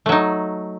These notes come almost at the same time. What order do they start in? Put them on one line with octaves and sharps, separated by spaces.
A3 F#3 D#4